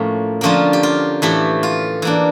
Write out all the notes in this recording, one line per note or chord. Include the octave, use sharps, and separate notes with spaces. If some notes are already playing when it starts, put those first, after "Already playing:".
Already playing: A2 F3 A#3 C#4
D3 F3 A#3 C#4 F4
G4
F4
A2 E3 A3 E4 G4
F4
E3 A#3 D4